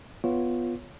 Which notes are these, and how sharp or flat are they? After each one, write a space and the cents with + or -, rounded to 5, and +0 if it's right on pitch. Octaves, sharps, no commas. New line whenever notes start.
B3 +0 F4 +0 C#5 +0